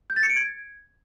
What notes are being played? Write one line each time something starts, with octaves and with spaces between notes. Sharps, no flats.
G6
A6
C#7
D7
G#6